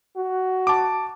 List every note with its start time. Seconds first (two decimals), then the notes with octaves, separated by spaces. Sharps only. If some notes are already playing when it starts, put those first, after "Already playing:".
0.16 F#4
0.67 A5 D6